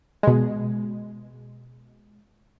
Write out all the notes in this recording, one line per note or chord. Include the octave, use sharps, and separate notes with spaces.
B2 G#3